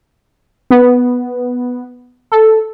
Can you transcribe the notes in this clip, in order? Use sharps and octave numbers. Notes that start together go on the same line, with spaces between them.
B3
A4